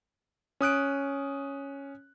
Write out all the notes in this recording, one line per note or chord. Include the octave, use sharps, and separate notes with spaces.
C#4 D#6 F#6 D7